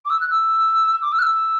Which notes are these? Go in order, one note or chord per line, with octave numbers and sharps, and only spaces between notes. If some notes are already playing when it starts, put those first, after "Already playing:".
D6
E6
F#6
E6
D6
E6
F#6
E6